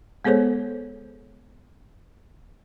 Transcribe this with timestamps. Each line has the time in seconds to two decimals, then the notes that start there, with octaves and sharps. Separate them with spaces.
0.25 G#3 B3 G#4 A4 C5 C#5